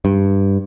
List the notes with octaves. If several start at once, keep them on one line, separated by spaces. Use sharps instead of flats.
G2